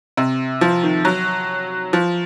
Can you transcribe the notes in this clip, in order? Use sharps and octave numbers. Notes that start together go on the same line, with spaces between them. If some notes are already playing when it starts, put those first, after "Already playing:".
C3
F3
D#3
F#3
F3